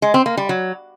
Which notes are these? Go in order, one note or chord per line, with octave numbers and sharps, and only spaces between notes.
G#3
C4
A#3
G3
F#3